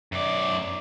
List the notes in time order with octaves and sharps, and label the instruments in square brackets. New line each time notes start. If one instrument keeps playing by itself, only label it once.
[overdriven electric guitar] F#2 D5